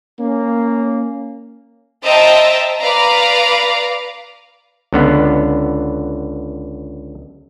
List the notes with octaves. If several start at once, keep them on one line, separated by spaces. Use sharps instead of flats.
A#3 C#4
C5 D#5 E5 G5 A5 A#5
B4 D5 F5 A#5
C#2 D3 B3